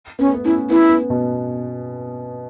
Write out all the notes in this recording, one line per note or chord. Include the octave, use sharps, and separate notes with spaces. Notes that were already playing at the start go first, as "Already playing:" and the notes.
B3 C#4
A3
B3
C#4 E4
B3 E4
B3
B2